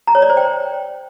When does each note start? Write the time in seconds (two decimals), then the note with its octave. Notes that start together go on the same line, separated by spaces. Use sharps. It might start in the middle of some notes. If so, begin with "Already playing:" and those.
0.07 A#5
0.15 C#5
0.22 D5
0.30 C5
0.37 G5